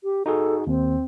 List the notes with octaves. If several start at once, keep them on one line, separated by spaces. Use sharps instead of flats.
G4
D#4 F#4 G#4 A4
D#2 C4